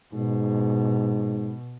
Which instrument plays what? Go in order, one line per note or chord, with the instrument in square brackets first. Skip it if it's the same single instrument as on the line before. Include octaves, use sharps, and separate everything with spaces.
[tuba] G#2 [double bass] B2